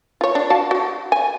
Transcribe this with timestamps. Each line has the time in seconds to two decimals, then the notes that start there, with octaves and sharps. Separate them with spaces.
0.21 F4 C#5
0.35 D4
0.50 F#4 F5 A5
0.71 F#4
1.12 G#5